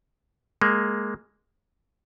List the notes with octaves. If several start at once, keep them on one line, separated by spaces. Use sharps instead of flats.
G#3 A#3